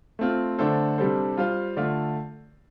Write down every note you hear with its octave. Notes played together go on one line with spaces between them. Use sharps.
A3 C4 F4
D3 A3 D4 A4 C5
C3 G3 D4 A4 C5
G3 F4 C5 F5
D3 A3 F4 D5 F5